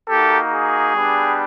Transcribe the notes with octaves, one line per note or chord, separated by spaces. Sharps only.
A#3 D#4 F#4 G4 A4
G#4
G3 B3 D4 G4